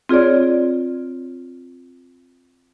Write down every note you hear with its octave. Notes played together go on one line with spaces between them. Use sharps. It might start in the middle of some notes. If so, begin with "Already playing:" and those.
C4 F4 G#4 C#5 D5